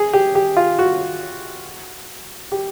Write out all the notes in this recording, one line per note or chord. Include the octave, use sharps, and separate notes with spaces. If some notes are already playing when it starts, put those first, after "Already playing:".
Already playing: G#4
G4
G4
F4
F#4
G4